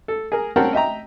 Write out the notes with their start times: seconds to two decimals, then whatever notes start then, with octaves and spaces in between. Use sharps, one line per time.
0.08 A4
0.32 G#4 A#4
0.56 C4 C#4 A#4 F#5 G5 A5
0.73 D#5 E5 G5 A#5